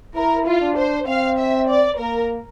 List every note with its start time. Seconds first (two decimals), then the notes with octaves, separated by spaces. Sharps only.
0.15 E4 A#4
0.47 F4
0.61 D4
0.77 C5
1.07 C4 F5
1.38 E5
1.68 D5
1.99 A#3 A#4